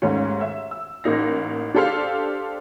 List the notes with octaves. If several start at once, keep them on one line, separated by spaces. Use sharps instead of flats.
D#2 G#2 A3 C#4
E5
E6
A1 A#3 D#4 A#6
D4 G4 A4 C5 F5